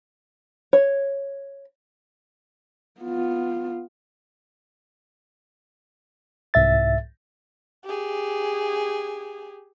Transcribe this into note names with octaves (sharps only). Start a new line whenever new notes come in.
C#5
B3 F4
C2 G#2 E5 A6
G4 G#4